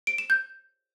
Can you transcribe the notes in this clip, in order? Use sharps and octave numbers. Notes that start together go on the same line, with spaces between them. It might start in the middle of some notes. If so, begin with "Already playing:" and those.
D7
E7
G6